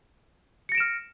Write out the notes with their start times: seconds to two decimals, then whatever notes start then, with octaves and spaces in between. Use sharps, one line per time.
0.69 C#7
0.72 A#6
0.75 D7
0.78 E7
0.80 F6